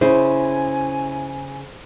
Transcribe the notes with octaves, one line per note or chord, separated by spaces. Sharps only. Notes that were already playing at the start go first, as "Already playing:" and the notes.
C#3 E4 C5 G#5